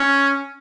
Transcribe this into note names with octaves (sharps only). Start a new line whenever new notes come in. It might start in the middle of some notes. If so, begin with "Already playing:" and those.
Already playing: C#4